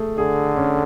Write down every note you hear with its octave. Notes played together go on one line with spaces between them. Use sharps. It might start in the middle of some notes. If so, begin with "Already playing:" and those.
Already playing: A3 G#4
D3 G#4
C#4